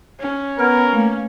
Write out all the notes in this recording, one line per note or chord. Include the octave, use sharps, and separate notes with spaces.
C#4
B3 A#4 B4 F6 G#6
A3 A#3